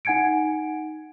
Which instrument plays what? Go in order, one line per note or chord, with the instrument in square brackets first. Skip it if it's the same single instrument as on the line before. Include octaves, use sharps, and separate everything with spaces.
[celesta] D#4 F#5 G#5 G#6 C#7 D7